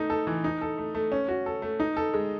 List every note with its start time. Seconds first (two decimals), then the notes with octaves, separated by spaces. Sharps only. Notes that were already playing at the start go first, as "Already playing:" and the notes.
Already playing: A3 D#4
0.10 A4
0.27 E3
0.44 D#4
0.61 A4
0.78 A3
0.95 A3
1.12 C#4
1.28 F#4
1.46 A4
1.62 A3
1.80 D#4
1.97 A4
2.14 G#3